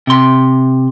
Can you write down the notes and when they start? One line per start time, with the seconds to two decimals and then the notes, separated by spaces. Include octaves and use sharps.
0.07 C3 C6